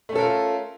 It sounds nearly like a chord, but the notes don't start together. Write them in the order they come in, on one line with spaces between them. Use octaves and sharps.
A3 C#4 A4 A#4 F4